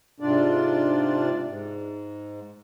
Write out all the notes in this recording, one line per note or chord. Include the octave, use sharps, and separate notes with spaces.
G#2 C3 D4 F4 D5
G#2